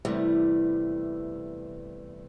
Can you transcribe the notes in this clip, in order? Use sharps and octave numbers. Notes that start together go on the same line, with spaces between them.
E2 C3 E3 G3 A3